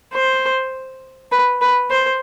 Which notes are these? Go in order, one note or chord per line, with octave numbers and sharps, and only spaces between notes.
C5
B4
B4
C5